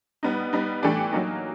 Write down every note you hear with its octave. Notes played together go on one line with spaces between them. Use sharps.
G3 B3 D#4
G3 B3 D#4
E3 A3 D4 G4
F#3 A#3 D#4